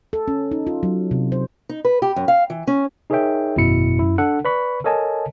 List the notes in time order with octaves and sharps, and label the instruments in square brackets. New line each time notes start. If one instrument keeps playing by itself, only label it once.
[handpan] A4
C#4
D#4
F4
F#3
C3
C5
[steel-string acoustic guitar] D#4
B4
G4
F#2
F5
E3
C#4
[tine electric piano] D#4 G#4 A#4 C#5 E5 G5
G#1 F#2 B2 E4 C#7
F#2 E4
D4 A4 F#5
B4 D5 B5 C#6
A4 A#4 C#5 D#5 G#5 A5